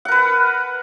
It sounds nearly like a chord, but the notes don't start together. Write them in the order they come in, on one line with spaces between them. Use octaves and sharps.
F#5 A#4 B4